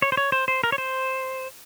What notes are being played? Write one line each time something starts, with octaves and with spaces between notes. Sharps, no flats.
C#5
C5
C#5
C5
C5
A#4
C#5
C5